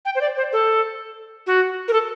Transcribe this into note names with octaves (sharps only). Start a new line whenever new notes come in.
G5
C5
D5
C5
A4
F#4
A#4
A4